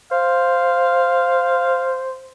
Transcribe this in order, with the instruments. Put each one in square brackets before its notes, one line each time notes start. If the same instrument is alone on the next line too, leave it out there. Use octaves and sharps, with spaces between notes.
[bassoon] C5 [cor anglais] F5